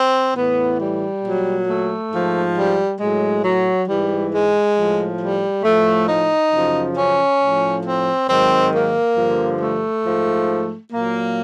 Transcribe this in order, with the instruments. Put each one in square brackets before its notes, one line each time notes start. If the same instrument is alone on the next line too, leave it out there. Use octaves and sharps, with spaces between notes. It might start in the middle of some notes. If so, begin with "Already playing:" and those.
Already playing: [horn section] C4
A2 E3 B3
G3
A#2 F#3
A3
G#2 F3
G3
A2 F#3 G#3
F#3
G#2 E3 G3
G#3
A2 F3
G3
A2 F3 A3
D#4
F#2 C#3 F3
C#4
A2 F3
C4
G#2 D#3 F#3 C4
A#3
G2 D3 F3
A3
G#2 F3
A#2 F#3 A#3